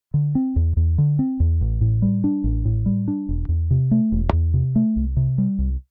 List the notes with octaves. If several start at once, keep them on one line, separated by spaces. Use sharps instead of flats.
D3
C4
E2
E2
D3
C4
E2
A1
A2
G3
D4
A1
A2
G3
D4
E1
E2
C3
A3
E1
E2
C3
A3
C2
C3
G3
C2